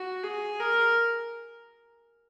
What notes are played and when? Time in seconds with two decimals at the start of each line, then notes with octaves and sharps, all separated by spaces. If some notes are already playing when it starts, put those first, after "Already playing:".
Already playing: F#4
0.23 G#4
0.60 A#4